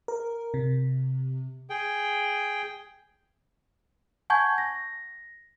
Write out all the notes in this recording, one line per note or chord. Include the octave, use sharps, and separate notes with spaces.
A#4
C3
G#4 G5
F#5 G#5 A5 C#6 G6 G#6
A#6